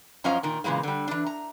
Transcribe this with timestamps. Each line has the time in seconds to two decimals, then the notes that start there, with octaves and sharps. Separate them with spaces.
0.24 F#2 F3 C#4 D#5 F5 A#5
0.43 A#2 D#3
0.64 A#2 C#3 E3 G#3 A#3
0.83 D3 G3
1.08 E3 D4
1.27 A#5